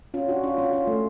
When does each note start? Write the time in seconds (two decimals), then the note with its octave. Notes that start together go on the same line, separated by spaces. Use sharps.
0.14 C#4 F4
0.28 D4 F#4
0.43 C#4 F4
0.58 C#4 F4
0.73 C#4 F4
0.87 A3